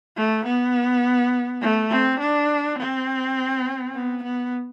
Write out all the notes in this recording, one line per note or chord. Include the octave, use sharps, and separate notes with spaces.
A3
B3
A3
C4
D4
C4
B3
B3